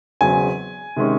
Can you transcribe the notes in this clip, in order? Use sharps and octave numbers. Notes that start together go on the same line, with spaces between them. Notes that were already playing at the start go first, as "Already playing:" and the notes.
E1 E2 C#3 F#3 C4 G#5
C3 D#3 G#3 C#4